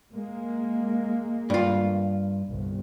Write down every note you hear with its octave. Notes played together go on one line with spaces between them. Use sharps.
G#3 A#3
G2 F4
G1 C2